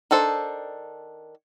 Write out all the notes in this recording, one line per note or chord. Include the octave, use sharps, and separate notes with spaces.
D#3 D4 A4 C5